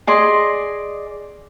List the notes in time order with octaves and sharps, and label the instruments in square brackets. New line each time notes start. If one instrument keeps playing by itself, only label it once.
[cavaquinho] G#4 D5 D#5 C6